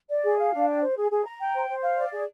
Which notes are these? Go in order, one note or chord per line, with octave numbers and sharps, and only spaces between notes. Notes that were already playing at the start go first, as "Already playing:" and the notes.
D5
G#4
F5
D4
G5
C5
G#4
G#4
A#5
G5
C5
C5
F5
D5
G#4